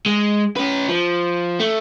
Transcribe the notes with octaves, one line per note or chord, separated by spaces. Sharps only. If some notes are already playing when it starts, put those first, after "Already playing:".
G#3
C#4 B4
F3
A3